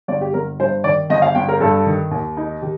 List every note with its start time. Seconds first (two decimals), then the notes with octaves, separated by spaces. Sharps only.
0.08 G1 D5
0.21 G4
0.34 G1 A#4
0.59 G2 C5
0.84 D#3 D5
1.10 G1 D#5
1.22 F5
1.35 G1 G5
1.48 A#4
1.60 G2 A4
1.86 D#3
2.11 D#2
2.37 D#4
2.62 D#3 G4